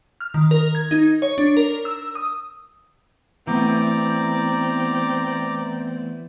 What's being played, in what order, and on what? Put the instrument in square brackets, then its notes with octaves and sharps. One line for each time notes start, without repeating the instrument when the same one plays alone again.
[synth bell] F6
D#3
A#4
G#6
D#4
C#5
D4
A#4
E6
D#6
[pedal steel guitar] E3 [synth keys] A3 B3 G6 [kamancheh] C4 D5 [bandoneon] A#5 D6